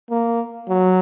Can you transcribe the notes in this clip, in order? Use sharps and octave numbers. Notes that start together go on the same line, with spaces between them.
A#3
F#3